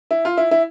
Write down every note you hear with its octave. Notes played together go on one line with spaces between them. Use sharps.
E4
F4
E4
E4